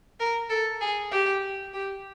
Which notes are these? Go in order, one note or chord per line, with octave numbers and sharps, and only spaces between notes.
A#4
A4
G#4
G4
G4